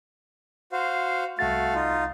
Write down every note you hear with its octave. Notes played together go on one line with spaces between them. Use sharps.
F#4 C5 F5
C2 A3 F#4 F5 A6
D#4 F4